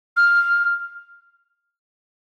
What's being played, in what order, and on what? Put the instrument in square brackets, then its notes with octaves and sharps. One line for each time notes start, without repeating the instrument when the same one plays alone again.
[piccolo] F6